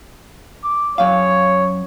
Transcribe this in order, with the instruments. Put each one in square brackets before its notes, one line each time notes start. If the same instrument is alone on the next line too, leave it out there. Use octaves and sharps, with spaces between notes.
[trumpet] D6
[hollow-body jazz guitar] F#2 F5 [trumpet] C#5